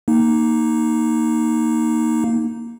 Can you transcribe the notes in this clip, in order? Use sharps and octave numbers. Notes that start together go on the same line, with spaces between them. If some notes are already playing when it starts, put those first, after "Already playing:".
A#3 D#4